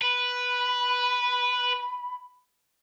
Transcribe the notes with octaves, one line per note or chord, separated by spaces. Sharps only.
B4 B5